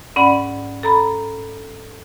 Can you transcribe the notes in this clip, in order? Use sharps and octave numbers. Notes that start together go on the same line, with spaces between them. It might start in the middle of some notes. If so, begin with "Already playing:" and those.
G#2 C#4 D5 F#5 B5
A4 A#5 B5